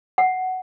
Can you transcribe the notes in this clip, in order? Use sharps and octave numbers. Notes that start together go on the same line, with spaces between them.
F#5